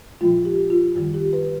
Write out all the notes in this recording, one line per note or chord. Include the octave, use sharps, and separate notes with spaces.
A#2 F3 G#3 F4
G4
F4
F#2 D#3 G3 F#4
G4
B4